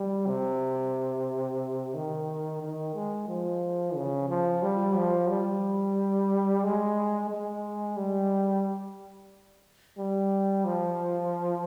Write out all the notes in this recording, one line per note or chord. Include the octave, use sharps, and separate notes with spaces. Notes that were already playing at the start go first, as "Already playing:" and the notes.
Already playing: G3
C3
D#3
D#3
G#3
F3
C#3
F3
G3
F3
G3
G#3
G#3
G3
G3
F3